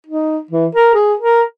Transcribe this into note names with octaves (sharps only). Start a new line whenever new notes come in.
D#4
E3
A#4
G#4
A#4